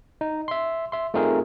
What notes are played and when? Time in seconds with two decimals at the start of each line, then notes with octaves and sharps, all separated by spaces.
0.21 D#4
0.48 E5 C6
0.92 E5 C6
1.14 A3 C4 D#4 F4 G#4 A#4